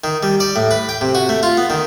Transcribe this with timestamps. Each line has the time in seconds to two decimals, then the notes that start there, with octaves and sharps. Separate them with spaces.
0.04 D#3
0.23 G3
0.40 D5
0.56 A2
0.71 B4
0.89 G5
1.01 C3
1.15 F#4
1.29 A3
1.43 F4
1.57 B3
1.70 D#3